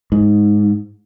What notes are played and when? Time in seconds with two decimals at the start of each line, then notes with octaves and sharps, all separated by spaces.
0.12 G#2